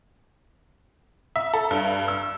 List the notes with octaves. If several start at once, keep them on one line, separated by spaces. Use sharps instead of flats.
E5
A4
G2
E6